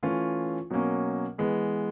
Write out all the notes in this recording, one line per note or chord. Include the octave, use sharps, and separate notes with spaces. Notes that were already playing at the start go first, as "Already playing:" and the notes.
E3 A3 C#4 F4
B2 F#3 A#3 C#4
E3 G#3 B3